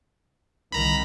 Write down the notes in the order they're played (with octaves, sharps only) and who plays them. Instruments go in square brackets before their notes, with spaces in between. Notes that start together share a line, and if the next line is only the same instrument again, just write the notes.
[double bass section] C2 D#3 [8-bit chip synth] A#5 B5